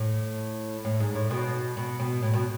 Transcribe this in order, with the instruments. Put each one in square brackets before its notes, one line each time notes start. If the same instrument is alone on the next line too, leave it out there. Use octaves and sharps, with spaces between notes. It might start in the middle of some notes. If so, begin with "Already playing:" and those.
Already playing: [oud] A2
A2
G#2
A2
B2
B2
B2
A2
B2